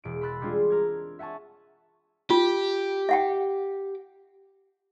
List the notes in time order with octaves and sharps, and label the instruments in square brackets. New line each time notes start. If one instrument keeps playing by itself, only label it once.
[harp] E1 D7
B5 C6 E6 F#6 A6 B6
G3 G#3 C4 D4 F4 G#4
A#4 G#6
E5 F#5 G#5 A5 C#6
[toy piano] F4 [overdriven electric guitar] G4
[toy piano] E5 F#5 G5